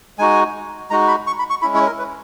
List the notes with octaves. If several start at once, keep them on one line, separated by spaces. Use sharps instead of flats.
G#3 D#4 F#4 G#5
G#3 D#4 F#4 A#5
B5
C#6
B5
C#6
G#3 C#4 E4 B5
C#5
A#4
B4